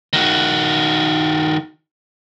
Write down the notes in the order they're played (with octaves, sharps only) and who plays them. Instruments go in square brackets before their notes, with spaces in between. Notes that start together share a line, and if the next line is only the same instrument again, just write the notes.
[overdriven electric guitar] D#3 F#4